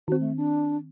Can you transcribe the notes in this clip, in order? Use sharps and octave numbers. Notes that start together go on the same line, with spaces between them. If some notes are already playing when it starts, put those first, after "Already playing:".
D#3 C4 F#4
A3
D4